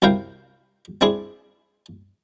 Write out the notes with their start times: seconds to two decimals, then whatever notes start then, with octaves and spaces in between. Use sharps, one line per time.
0.02 C2 C3 E4 A#4 F5 G5
1.01 C4 D4 E4 G#4